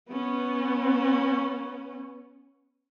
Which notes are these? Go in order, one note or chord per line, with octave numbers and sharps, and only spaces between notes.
B3 C#4